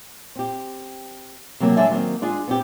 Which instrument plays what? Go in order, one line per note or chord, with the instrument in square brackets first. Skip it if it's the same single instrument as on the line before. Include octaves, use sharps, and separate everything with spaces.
[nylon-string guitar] C4 G4
C3 E3 F#3 A#3
F#3 G#3 D4 D5 E5 G#5
D#3 F#3 A#3 C4
G#3 D4 F4 G#4
B3 C4 G4